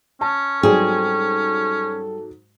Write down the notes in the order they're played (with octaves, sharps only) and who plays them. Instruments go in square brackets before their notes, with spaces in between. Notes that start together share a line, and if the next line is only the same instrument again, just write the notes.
[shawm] C#4 [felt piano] A5
[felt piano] G#2 F#3 [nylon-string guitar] G3 C4 G#4 [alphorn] A4